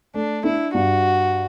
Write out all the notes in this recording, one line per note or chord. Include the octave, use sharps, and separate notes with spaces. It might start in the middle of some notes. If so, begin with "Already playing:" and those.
A3 D4
D4 E4
G2 F#4